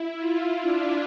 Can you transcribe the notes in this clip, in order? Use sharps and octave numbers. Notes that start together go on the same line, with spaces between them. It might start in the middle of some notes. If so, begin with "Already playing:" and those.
Already playing: E4
F4
D4